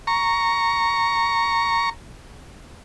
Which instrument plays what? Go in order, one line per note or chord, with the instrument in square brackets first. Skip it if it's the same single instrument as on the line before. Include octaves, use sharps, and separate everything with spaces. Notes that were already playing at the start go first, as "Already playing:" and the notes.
[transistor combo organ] A#5 C#6